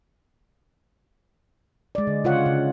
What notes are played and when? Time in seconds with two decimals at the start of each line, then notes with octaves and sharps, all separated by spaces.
1.95 G#3 D5
2.07 D3
2.24 C#3 F4 C#5 F#5
2.46 C#3